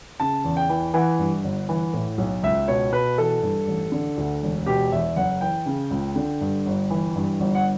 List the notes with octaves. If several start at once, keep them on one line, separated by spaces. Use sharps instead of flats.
C#3 A5
E2
G5
E3
E3 F#5
G2
G1
E3
A2
B1
C#2 E5
B2 C#5
B2 B4
E3 A4
G2
A1
D3
D2
E1
B2 G4
E2 E5
F#1 F#5
E3 G5
C#3
C#2
D3
G2
G1
E3
G2
G1
F#5